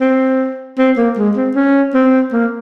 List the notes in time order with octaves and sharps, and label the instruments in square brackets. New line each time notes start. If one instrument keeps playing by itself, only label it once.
[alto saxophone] C4
C4
A#3
G#3
C4
C#4
C4
A#3